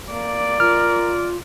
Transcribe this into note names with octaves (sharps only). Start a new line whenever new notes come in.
A#3 D5
F4 A#4 F6